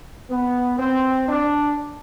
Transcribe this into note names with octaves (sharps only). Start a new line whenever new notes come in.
B3
C4
D4